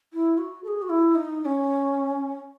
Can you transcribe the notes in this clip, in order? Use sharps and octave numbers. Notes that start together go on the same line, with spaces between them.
E4
F#4
A4
G#4
F#4
E4
D#4
D#4
C#4